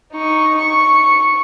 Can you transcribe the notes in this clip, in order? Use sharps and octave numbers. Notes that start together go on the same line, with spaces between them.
D#4 C#6
C#6